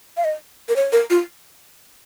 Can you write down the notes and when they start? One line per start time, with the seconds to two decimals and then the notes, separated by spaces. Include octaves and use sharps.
0.17 F5
0.24 D#5
0.68 A#4
0.76 C#5
0.92 A#4
1.10 F4